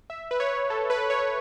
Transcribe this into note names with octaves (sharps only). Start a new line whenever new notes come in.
E5
B4
C#5
A4
B4
C#5